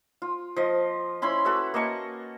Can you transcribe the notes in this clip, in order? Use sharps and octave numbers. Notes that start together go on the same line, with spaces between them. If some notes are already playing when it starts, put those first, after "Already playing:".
F4
F3 D#5
C#4 E4 B5 C6
F#4 A4 B4 E5
A#3 D#5 A5 C#6